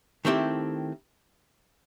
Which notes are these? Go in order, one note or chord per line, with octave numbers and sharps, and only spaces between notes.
D#3 A3 C4 E4 G4